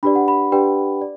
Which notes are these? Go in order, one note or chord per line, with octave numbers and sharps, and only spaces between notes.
D4 G4 B4 D5 B5
F#5
B5
D4 G4 B4 D5 G5
D5